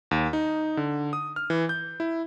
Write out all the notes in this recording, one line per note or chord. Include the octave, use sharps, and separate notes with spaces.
D#2
D#4
D3
D#6
F6
E3
G6
E4